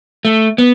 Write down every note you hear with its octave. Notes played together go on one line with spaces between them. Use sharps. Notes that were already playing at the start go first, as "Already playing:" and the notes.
A3
B3